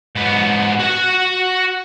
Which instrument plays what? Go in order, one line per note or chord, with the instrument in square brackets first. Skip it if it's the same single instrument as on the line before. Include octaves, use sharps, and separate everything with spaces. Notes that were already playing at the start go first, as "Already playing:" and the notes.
[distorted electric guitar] G#2 B3
F#4 F#5